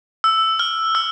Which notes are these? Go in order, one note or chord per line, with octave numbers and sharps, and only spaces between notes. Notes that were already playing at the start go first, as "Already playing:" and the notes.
E6
F6
E6